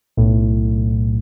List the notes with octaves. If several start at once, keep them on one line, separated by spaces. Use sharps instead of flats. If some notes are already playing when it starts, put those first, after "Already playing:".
B1 A2